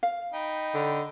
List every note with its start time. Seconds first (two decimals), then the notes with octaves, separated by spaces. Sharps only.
0.03 F5
0.33 D#4 G5 B5
0.74 D3